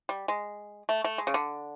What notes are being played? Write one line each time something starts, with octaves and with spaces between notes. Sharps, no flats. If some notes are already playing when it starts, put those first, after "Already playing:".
G3
G#3
A3
A3
G#3
C#3
D3